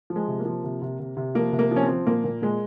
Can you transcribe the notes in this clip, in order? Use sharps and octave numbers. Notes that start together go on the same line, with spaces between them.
F3
G#3
C3
A#3
F3
C3
C3
C3
C3
F3 A#3
C3
A#3
F3
C#4
C4
F3
A#2 A#3
A#2
A#2 G#3